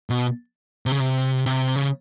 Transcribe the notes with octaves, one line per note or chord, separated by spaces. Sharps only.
B2
C3
C#3
C3
C3
C#3